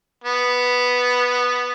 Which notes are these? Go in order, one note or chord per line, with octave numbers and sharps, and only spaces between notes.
B3